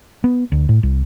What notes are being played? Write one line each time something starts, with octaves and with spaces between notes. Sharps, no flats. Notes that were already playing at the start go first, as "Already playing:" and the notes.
B3
D2
A2
C2